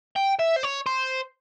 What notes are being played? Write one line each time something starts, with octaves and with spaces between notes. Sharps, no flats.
G5
E5
C5
C#5
C5